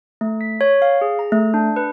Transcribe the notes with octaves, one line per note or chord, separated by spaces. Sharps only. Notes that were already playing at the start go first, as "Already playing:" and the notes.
A3
B6
C#5
F5
G#4
A#5
A3
D4
B4